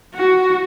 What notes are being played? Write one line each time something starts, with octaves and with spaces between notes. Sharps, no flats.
F#4